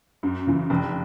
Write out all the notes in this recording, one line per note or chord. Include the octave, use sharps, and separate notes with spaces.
F#2
C#3 E3
F1